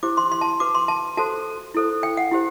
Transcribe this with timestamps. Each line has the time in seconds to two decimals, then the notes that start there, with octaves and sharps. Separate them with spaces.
0.03 E4 G4 C5 D6
0.17 C6
0.32 C6
0.41 A5
0.60 F#4 B4 D6
0.75 C6
0.88 A5
1.17 F#4 A4 C5 A5
1.74 E4 A4 C5
2.03 G5
2.17 F#5
2.31 E4 G4 C5